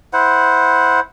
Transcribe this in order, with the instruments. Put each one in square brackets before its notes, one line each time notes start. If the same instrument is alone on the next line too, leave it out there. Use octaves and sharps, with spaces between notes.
[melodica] E4 C5 F#5